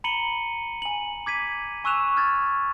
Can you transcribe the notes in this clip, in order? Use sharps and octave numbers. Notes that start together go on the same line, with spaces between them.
A#5 B5 C#7 D#7 F#7 G7
G#5 F#7
D6 G#6 B6 D#7
G#5 C#6 E6 F#6 E7 F7
F6 G#6 A6